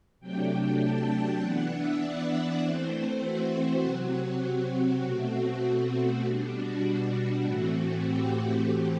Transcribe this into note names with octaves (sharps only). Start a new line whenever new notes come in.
C3 F#3 A3 D4 G5
G5
A5
G5
E3 B3 D4 F#5
E5
D5
E3 A3 C4 C5
F#4
C3 F#3 C4
B2 A3 C4 F#4
F#4
B2 G3 D4
F#4
A2 E3 A3 C4
G4
G4
A2 E3 A3 C4